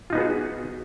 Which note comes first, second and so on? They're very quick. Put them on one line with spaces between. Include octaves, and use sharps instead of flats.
F4 D#4 B3 G#4 F#4